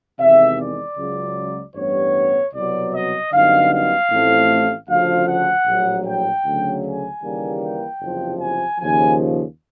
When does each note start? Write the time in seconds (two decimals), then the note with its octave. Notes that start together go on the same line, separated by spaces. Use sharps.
0.19 E2 C3 D#3 G#3 E5
0.58 D5
0.97 C#2 C#3 F#3
1.75 A1 G2 E3 G3 B3 C#5
2.53 C2 B2 F#3 D5
2.93 D#5
3.32 F#2 D3 G3 B3 D#4 F5
3.72 F5
4.10 A1 A2 F3 A3 C4
4.88 D2 C#3 F3 F5
5.27 F#5
5.67 A#1 A2 F#3
6.06 G5
6.45 D2 C#3 F#3
6.84 G#5
7.23 D#2 C#3 E3 G3 A#3
7.62 G5
8.01 F#1 E2 C3 F3
8.40 G#5
8.79 D#2 C#3 F3 G#5